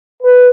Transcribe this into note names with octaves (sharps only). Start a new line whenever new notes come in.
B4